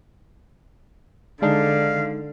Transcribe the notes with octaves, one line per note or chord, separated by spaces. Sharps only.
D3 G#3 D4 D#4 F5